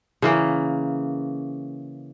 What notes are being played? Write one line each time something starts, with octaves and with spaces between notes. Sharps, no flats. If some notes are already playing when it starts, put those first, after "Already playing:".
C#3 E3 A#3